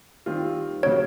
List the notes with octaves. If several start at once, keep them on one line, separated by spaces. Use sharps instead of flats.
D#3 G3 C4 F4
C#3 F#3 A#3 C#4 C#5